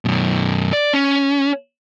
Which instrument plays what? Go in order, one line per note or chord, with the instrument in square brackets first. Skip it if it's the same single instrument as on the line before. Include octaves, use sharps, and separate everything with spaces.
[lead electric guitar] F#2 B2
D5
C#4